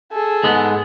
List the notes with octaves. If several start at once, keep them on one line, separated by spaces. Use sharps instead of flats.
G#4 A4
G#2 G#3 B3